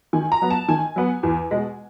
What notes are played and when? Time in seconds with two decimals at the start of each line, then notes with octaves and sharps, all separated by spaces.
0.13 D#3 G#5
0.32 A#5
0.42 F#3 B3
0.50 A5
0.69 D#3 G#5
0.96 F#3 B3
1.23 E2
1.51 B2 G#3